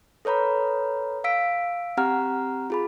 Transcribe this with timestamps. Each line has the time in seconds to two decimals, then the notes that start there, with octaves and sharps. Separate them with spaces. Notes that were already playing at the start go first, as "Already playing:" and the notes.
0.25 A4 B4 C#5 A#5 B5
1.24 F5 E6 B6 D7
1.97 C4 G4 F#5 A#5 F6
2.70 F4 G#4 B5